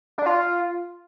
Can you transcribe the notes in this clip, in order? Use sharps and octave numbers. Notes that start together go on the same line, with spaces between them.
D4
F4